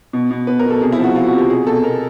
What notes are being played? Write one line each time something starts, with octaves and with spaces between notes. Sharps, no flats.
B2
B2
B2 B4
A#4
B2
A4
C3 G#4
E4
F3
F#4
F3 F4
F#4
C3 G4
B2 G#4
B2 A4
B2 A#4